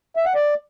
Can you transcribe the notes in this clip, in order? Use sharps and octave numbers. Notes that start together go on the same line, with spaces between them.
E5
F#5
D5